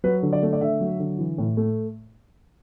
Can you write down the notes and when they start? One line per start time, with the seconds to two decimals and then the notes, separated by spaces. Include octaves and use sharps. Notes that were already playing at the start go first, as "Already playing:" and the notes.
0.04 F#3 B4
0.23 D3
0.33 D5
0.43 A3
0.53 D5
0.61 D3 E5
0.80 F#3
0.99 D3
1.19 E3
1.38 A2
1.57 A3